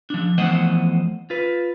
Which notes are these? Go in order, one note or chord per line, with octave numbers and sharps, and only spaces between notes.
F3 D4
E2 F3 A3 C5 D#5 F#5
F4 B4